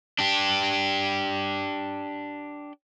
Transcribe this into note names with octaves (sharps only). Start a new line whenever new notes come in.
D4 G4